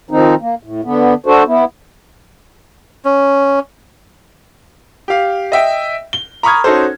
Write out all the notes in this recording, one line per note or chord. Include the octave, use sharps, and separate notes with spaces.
D#3 F3 C4 D#4
A#3
A2
D3 B3
D4 F#4 A4 C5
B3 E4
C#4
G4 F5
D#5 E5 G5
G7
A#5 B5 C#6 D#6 F6 G#6
C#4 D#4 F#4 A4 C5